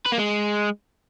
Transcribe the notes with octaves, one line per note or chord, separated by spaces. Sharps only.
B4
A#3
G#3